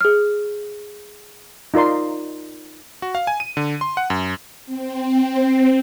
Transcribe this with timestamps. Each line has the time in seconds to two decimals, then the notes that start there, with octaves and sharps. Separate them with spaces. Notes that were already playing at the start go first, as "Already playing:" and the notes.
0.01 G#4 F6
1.74 D#4 F4 A#4 D5 C6
3.02 F#4
3.15 F5
3.27 G#5
3.40 D#7
3.57 D3
3.81 C6
3.97 F#5
4.10 F#2
4.66 C4